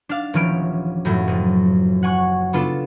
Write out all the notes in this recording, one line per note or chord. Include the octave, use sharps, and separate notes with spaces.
D4 F5
D#1 E3 F3 C#4 F6 D7
F#2 A2 F#3
F#1
F#5 G#5 C#6 F#6
C#3 B3 D4 F4 A4